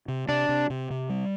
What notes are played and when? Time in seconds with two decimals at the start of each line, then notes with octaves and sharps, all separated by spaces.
0.08 C3
0.28 C3 D4
0.49 C3
0.70 C3
0.90 C3
1.09 G3